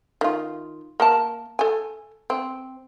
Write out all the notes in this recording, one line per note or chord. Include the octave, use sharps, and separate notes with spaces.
D#3 F4
A#3 A#4 A5
A4 G#5
C4